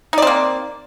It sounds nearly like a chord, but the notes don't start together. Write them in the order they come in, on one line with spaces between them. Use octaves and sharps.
D#4 D5 C4 A#3